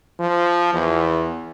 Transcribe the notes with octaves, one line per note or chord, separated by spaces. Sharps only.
F3
E2